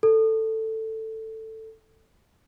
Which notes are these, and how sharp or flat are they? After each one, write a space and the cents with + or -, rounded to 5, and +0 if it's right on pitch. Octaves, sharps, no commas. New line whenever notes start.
A4 +10